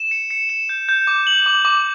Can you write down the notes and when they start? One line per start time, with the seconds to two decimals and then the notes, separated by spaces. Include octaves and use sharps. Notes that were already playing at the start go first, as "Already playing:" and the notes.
Already playing: E7
0.11 C#7
0.31 C#7
0.49 E7
0.69 G6
0.89 G6
1.07 D6
1.27 F#7
1.46 D6
1.65 D6